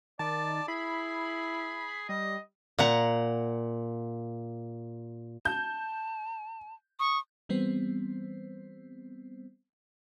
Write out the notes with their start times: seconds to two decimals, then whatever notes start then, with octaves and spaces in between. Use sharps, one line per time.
0.19 D#3 D5 A5
0.68 E4 G#4 B5
2.09 G3 D#5
2.79 A#2 F#5 A#5
5.45 A5 G6
6.99 C#6 D#6
7.49 E3 G3 B3 C4 C5